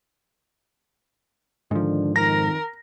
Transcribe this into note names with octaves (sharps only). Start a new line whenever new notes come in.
G#2 D3 D#3 F3 D4
F2 D#3 A#4 A#6